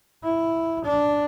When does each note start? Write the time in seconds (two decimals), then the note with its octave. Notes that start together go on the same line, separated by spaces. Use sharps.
0.23 E4
0.84 D4